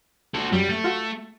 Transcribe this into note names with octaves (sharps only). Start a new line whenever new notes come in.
F#4 A4
F#2 F#3 G3
A3
F4 F#4